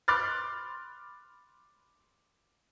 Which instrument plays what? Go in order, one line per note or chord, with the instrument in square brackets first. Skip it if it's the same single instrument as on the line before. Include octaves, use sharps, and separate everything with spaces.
[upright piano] B5 C6 D6 F6 F#6 A6